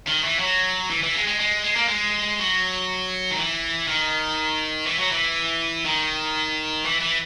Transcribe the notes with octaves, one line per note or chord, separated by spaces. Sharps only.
D#3
E3
F#3
E3
E3
G#3
G#3
G#3
G#3
A#3
G#3
F#3
D#3
E3
D#3
E3
F#3
E3
D#3
E3
E3